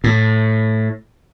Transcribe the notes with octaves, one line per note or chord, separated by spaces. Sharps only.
A2